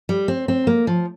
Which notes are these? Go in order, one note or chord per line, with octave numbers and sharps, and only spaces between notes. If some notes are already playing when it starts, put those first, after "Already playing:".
G3
C4
C4
A#3
F3